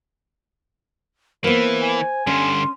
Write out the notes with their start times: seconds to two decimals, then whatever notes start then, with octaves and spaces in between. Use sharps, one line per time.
1.44 E3 A#3 B3 C5
1.83 G#5
2.27 G2 D3 C#4 C6